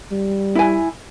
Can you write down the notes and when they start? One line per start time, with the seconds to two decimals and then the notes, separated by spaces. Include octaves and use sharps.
0.11 G3
0.55 E4 G#5